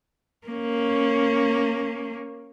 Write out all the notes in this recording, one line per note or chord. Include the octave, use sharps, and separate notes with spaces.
A#3 C#4